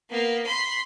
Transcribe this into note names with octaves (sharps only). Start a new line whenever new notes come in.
A#3 B3
B5 C6